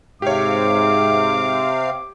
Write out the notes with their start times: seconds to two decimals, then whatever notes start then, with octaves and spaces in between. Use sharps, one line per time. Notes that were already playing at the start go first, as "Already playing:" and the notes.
0.22 G#2 C3 C4 G4 C#5 F5 D6